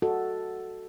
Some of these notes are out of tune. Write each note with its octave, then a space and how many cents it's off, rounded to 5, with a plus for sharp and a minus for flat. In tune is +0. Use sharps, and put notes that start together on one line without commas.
F#4 +0 A4 +0 D#5 +0